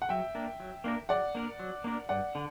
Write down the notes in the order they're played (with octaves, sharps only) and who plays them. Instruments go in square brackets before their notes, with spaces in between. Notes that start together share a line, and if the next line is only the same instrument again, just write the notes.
[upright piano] F#5
[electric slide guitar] F#3 [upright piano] E5 G5
[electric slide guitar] A#3 D4 A#4
F#3
A#3 D4 A#4
[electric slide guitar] F#3 [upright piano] D5 F#5
[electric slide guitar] A#3 D4 A#4
F#3
A#3 D4 A#4
[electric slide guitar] G2 [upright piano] D5 F#5
[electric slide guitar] D3